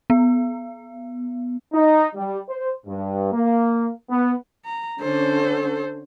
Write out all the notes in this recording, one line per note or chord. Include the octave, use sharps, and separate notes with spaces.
B3
D#4
G3
C5
G2
A#3
B3
A#5
D3 C#4 A4 C5